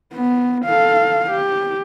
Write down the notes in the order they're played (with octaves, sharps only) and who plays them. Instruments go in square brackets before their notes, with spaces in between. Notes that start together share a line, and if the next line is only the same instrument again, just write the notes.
[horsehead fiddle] B3
A4 F5
G4